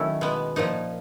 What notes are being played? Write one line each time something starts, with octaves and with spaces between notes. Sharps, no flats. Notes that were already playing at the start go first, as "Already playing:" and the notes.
Already playing: D#3 F#3 A3 C#4 E4
B2 G#3 B3
A#2 F3 A#3 D#4